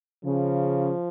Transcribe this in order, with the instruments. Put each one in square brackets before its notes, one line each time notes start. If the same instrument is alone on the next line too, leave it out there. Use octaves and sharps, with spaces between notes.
[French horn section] C#3 [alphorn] F3